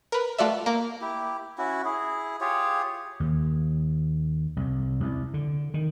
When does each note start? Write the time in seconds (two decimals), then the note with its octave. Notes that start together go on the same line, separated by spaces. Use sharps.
0.12 A#4 B4
0.38 A3 F4 F#4 D5 E5
0.66 A#3
1.01 E4 G4
1.58 C#4 E4 F#4
1.85 E4 G#4
2.41 F4 G4 G#4 C#5
3.20 D#2
4.57 C2
5.00 C2
5.34 D3
5.74 D#3